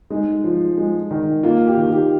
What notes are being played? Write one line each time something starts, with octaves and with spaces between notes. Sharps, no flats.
G#3 D#4
F3
G#3
D#3
A#3 F4
G4
D#3
G4